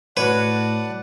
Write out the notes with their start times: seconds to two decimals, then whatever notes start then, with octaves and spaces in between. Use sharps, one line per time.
0.17 A2 F#4 B4 C#5 D5 F#5 A5